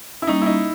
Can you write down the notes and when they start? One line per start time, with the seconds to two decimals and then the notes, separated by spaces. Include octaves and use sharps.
0.22 E4
0.27 G3 A#3 C#4 D#4
0.42 E4
0.46 D#4